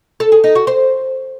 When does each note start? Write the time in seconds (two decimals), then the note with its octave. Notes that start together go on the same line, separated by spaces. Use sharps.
0.20 A4
0.32 G#4
0.44 D#4
0.55 F#4
0.67 C5